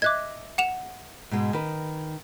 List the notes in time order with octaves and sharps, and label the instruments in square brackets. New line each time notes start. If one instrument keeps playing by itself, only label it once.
[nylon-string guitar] D#5 E5 [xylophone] D6 F#6 G#6
[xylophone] F#5 E7 F7
[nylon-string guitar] G#2 B2 G#3
D#3 B4